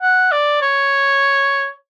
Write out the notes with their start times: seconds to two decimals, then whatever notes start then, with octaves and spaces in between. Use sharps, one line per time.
0.02 F#5
0.32 D5
0.62 C#5